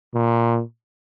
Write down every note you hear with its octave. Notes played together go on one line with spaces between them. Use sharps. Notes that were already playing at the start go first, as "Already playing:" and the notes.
A#2